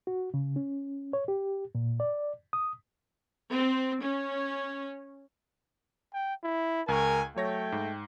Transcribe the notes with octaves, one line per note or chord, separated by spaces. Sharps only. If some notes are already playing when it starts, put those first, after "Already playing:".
F#4
C#3
C#4
C#5
G4
A#2
D5
D#6
C4
C#4
G5
E4
C#2 A#4 G#5 C#6
F#3 A3 C#5 G5 A#6
G#2